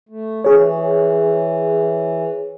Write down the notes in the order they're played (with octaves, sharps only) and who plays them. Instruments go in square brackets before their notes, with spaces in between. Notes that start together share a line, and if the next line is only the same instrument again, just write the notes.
[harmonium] A3
[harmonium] E3 [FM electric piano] G#4 C#5